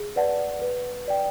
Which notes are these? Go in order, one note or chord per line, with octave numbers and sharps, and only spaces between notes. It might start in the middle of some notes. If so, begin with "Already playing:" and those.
Already playing: G#4
B4 D5 F#5 A5
B4
D5 G5